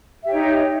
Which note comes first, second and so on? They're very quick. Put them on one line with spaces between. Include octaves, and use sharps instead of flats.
E5 G4 C#5 D#4